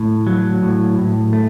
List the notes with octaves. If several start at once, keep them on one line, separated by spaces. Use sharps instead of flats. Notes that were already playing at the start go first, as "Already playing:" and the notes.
Already playing: A2
F#3
A2
A2
A3